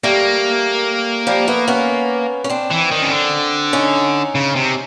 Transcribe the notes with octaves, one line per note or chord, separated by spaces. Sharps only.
G3 A3 A#3
F3 G3
A3 B3
B3 C#4
C#4
C4 D4
E3
D#3
C#3
D3
C#4 D#4
C#3
C3